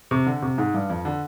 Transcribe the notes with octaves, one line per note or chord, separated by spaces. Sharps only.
C3
D3
C3
G#2
G2
F2
D3